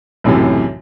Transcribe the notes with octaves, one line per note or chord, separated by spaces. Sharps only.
B1 F#2 A2 C3 E3